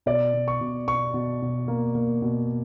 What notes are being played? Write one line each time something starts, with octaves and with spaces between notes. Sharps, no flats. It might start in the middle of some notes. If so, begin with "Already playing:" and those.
B2 D5
B2
C#6
B2
B2 C#6
B2
B2
A#3
A#3
B2